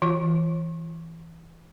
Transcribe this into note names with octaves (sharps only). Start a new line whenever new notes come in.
E3 F4